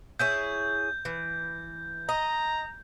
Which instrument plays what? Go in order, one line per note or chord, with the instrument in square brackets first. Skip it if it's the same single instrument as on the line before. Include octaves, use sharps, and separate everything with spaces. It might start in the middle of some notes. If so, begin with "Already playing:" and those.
[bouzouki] E4 G#4 C#5 [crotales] G6
[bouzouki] E3
[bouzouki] D#5 [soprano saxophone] A#5